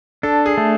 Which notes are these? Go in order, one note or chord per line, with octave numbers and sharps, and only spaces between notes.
D4 A4
G#4
A3